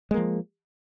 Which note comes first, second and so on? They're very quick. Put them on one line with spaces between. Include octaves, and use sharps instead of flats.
G#3 A#3 F3